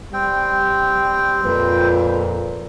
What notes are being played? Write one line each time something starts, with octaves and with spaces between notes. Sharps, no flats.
G3 C4 G5
F2 A#2 B4